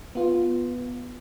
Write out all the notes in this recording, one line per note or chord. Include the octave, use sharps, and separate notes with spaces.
B3 F4